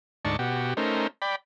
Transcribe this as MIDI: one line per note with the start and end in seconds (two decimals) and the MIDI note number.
0.25 0.37 38
0.25 0.37 44
0.25 0.37 63
0.25 0.37 74
0.25 0.37 81
0.25 0.37 85
0.39 0.74 47
0.39 0.74 66
0.39 0.74 67
0.77 1.07 57
0.77 1.07 61
0.77 1.07 63
0.77 1.07 70
0.77 1.07 72
1.22 1.36 74
1.22 1.36 79
1.22 1.36 83